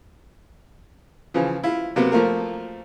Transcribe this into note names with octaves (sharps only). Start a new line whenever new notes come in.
C#3 E3 F3
E4 F4
C3 F#3 A#3 B3
F3 A3 A#3 A#4